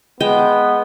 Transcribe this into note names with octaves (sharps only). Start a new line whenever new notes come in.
G#3 B3 G5